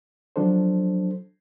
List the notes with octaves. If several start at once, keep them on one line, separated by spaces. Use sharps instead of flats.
F3 F#3 D4 A4 C5